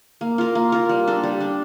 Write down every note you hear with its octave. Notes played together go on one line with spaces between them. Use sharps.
A#3
F4 A#4
A#3
F4 A#4
G3
D4 A4
G3
D4 A4